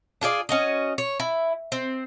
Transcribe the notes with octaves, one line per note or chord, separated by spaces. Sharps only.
D4 F4 G#4 D5
C#4 F#4 D#5
C#5
E4
C4